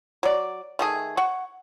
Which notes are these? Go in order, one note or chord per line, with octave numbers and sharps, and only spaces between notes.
F#3 D5
D#3 A3 G#4
F#5 C#6